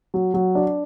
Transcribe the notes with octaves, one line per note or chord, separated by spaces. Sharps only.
F#3
F#3
D4